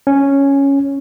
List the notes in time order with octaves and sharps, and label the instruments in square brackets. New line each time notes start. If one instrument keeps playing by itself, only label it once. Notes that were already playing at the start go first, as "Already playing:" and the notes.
[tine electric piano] C#4